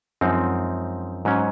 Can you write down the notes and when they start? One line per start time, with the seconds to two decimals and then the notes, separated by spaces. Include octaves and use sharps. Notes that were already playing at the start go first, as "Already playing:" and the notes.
0.21 F#2 F3 G#3 C4 D#4
1.25 G#2 F#3 C#4